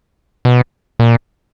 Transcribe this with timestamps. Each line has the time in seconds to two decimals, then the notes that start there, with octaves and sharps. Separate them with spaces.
0.45 B2
0.99 A#2